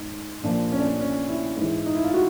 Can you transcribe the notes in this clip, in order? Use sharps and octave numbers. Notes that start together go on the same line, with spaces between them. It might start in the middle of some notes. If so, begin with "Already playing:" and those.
Already playing: G#2
A#2 F3 D4
C#4
D4
C#4
C#4
E4
G#2 E3
D#4
E4
F4
F#4